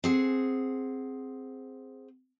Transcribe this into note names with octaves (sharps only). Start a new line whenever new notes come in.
C4 G#4 F#5